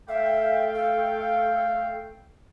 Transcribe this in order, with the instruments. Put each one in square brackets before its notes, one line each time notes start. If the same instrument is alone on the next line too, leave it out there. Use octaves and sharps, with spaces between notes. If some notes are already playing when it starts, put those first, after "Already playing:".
[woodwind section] A3 F5 G5 [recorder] E5
[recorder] A4